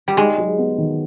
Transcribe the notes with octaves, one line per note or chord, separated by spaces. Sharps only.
G3
G#3 D#4
F#3
B3
D#3